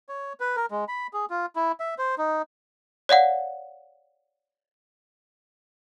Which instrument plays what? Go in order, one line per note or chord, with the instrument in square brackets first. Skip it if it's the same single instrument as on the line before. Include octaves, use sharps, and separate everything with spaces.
[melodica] C#5
B4
A#4
G#3
B5
G#4
F4
E4
E5
C5
D#4
[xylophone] C#5 D5 F5 F#5